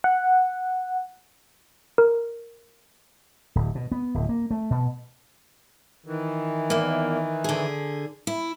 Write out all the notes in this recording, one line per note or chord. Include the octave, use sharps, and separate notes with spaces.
F#5
A#4
D1
B2
B3
D1
A#3
A3
B2
D#3 E3
E2 A#3
D3 G#4
E4